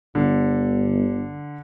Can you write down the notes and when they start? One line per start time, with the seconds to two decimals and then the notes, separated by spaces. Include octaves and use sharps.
0.15 G1 D3